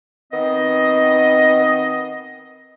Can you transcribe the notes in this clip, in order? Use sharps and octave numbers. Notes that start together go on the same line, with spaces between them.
D#3 B3 C4 D#5